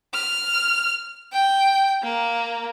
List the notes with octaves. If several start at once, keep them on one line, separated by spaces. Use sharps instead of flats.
F6
G5
A#3